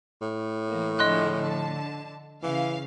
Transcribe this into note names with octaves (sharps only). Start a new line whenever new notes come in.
A2
E3 A#3
D3 F3 G#3 D#5 C6 F#6
D3 A5
C#3 E3 F5